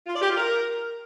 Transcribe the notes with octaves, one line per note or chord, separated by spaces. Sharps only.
F4
D5
G4
F4
A#4